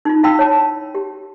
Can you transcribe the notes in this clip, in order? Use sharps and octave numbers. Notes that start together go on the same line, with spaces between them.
D#4 F4
E4 F5 G5 B5 E6
C#5 A5
G4